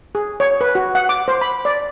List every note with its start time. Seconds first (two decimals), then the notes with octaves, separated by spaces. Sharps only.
0.15 G#4
0.40 C#5
0.61 B4
0.75 F#4
0.95 F#5
1.09 D6
1.28 C5
1.41 B5
1.65 D5